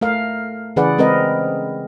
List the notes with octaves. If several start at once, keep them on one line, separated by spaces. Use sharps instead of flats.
A3 A#4 F5
C#3 E3 G#4 B4 D5 F#5
G#3 C4 A#4 B4 D#5